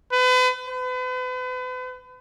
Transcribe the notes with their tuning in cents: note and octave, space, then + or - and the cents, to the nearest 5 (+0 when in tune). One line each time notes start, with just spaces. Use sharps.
B4 +40
B4 +40